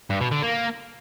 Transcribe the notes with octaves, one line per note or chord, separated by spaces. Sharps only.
G2
B2
D3
A#3